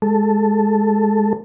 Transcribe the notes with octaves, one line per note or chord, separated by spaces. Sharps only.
G#3 A4